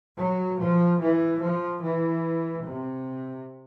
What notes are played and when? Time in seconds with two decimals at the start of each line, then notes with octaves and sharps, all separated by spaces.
0.19 F#3
0.60 F3
1.01 E3
1.43 F3
1.83 E3
2.65 C3